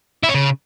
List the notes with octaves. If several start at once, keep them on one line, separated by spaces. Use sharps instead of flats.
E4
C#4
C#3